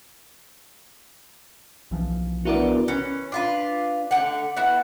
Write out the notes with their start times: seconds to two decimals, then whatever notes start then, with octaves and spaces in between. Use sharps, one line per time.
1.91 B1 E3 F3
2.45 B3 D4 E4 F#4 A#4 D5
2.88 E3 C#4
3.32 D4 F4 B4
4.11 D3 A3 G4 F#5
4.56 B3 E4 F#4